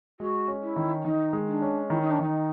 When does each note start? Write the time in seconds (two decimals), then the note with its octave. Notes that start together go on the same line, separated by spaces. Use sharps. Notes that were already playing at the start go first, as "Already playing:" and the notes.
0.20 G#3 F#4
0.48 C#4
0.62 E4
0.76 D#3
1.05 D#3 D#4
1.33 G#3
1.48 D4
1.62 C#4
1.90 D#3 E4
2.01 D#4
2.11 D4
2.19 D#3 D#4